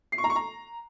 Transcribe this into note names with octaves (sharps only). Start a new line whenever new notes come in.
C7
C#6
A#5
C#6
A#5